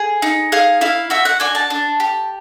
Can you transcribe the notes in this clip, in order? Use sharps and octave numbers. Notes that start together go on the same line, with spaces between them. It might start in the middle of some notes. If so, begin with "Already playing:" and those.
Already playing: G#4
D#4
G#4 F5
E4 F5
F#4 E5
F#5
D4 G#5
A5
D4
G4